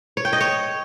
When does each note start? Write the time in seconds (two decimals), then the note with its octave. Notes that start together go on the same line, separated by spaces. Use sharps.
0.17 C#5
0.25 G5
0.33 D#5
0.41 C#5